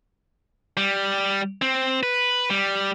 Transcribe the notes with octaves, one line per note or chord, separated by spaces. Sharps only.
G3
C4
B4
G3